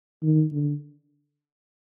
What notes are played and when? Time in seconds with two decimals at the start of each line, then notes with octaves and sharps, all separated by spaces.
0.23 D#3
0.52 D3